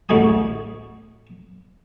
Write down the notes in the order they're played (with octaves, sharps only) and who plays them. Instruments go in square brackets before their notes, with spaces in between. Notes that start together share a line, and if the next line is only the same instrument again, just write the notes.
[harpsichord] A1 D2 D3 F#4 G#5 D#6